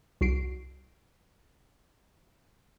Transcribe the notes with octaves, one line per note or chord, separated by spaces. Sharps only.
C2 F#4 C7 D7